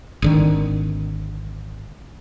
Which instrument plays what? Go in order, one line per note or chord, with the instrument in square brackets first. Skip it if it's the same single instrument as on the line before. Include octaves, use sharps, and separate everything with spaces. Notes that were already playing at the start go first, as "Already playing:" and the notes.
[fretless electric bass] G#1 D3 D#3